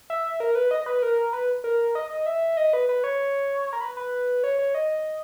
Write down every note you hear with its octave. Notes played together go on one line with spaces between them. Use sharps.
E5
A#4
B4
D#5
B4
A#4
B4
A#4
D#5
D#5
E5
D#5
B4
B4
C#5
A#4
B4
B4
C#5
C#5
D#5